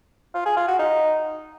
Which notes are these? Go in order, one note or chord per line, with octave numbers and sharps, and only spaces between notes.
F4
G#4
F4
F#4
D#4